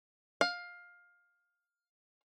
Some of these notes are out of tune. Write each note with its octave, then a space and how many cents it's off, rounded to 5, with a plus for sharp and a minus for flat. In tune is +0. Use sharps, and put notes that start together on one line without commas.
F5 +15